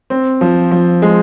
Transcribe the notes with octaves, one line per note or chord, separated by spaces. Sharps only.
C4
F3
F3
G#3